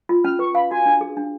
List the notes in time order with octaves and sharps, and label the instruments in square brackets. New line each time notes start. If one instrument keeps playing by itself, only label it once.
[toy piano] F4
[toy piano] C#4 [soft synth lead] F6
[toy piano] B4 [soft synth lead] C#6
[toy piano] F5 [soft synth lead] B5
[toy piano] F#4 [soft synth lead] G#5
[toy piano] D4
G#4
D4